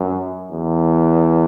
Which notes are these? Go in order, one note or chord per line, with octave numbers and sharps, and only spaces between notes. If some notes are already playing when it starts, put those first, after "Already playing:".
Already playing: F#2
E2